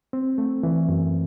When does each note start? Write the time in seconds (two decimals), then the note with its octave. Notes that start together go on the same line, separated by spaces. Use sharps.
0.13 C4
0.38 A3
0.63 E3
0.89 F#2